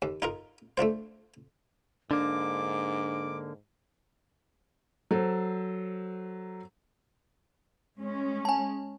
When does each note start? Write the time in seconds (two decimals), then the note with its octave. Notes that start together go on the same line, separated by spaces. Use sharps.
0.02 D#2
0.22 D#4 F4 A#4
0.77 A3 D4 F4 C5
2.11 G#2 D3 A#3 D4 D6
5.11 F#3 A4 C5
8.00 G#3 C#4
8.45 G#5 A5